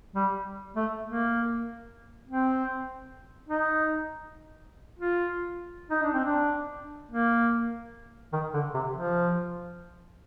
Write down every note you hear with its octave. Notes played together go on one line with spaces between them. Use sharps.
G3
A3
A#3
C4
D#4
F4
D#4
D4
C4
D4
A#3
D#3
D3
C3
F3